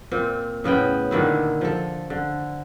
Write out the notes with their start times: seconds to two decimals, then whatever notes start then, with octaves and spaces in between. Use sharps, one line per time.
0.12 A#2 C4
0.64 A2 C#3 B3 G5
1.11 A#2 D3 D#3 E4
1.61 F3 A4
2.10 D3